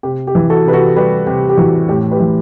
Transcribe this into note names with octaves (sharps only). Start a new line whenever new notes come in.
C3 G4
G4
E3
F#4 A4
C3 B4
F#4 A4
G3 G4 B4
C3 G4
G4
E3 F#4
A2 G4
G4 B4
E3